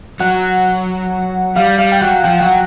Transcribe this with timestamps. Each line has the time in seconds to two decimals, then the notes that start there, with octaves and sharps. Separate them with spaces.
0.20 F#3 F#5
1.56 G3 F5
1.79 G3 F5
1.92 G5
2.01 F#3 F#5
2.24 F3 G5
2.40 F#3 F#5